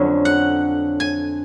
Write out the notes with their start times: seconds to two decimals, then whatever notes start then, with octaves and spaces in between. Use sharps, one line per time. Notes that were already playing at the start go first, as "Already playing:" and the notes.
Already playing: F2 D3 F#3 C#4
0.25 F#5
1.00 G#5